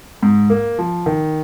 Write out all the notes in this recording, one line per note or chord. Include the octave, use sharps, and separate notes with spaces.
G#2
A#3
F3
D#3